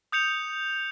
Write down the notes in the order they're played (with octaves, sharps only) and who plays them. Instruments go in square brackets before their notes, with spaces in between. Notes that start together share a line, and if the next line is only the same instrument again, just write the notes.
[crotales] D#6 G6 C#7 F7